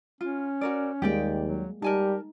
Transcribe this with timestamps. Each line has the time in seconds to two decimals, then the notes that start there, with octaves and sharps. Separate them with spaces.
0.21 C#4 F4
0.61 F#4 A#4 D5
1.02 D#2 G3 G#3 A#3 G4 D5 G5
1.43 F#3
1.82 G3 D#4 G4 A#4 G#5 A5